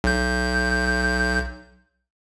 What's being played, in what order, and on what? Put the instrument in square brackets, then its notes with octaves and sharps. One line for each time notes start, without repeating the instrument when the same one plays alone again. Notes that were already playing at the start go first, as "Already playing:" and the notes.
[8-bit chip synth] B1 G6